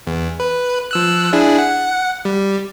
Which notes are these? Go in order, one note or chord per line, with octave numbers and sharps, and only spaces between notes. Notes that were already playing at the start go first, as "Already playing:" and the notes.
E2
B4
F3 E6 F#6
D4 E4 G#4
F#5
G3